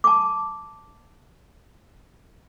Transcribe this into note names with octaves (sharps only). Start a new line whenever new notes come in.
A5 D6